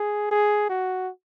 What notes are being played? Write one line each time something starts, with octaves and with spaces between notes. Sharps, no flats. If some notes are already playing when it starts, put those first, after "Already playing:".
Already playing: G#4
G#4
F#4